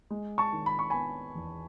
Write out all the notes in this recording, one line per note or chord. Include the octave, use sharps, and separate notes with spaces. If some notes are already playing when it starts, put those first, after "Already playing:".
G#3
A5 C#6
D#3
B5
C#6
B3 G#5 B5
E2